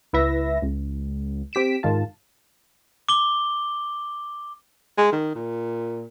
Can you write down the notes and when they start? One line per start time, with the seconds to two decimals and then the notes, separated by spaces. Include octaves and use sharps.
0.13 C#2 E4 B4 E5 A#6
0.62 C#2
1.53 C4 G4 B6 D7 E7
1.83 G#2 D#3 F4 A5
3.09 D6 G7
4.98 G#3
5.12 D#3
5.35 A#2